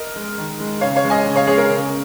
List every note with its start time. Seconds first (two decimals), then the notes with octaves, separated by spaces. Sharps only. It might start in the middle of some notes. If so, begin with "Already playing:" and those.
Already playing: A#4 D#5
0.16 G#3
0.38 D#3
0.60 G#3
0.81 C#3 C#5 F5
0.95 C#5 F5
1.04 G#3
1.10 D#5 G#5
1.25 C#3
1.36 C#5 F5
1.47 G#3 G#4 C#5
1.58 A#4
1.70 C#3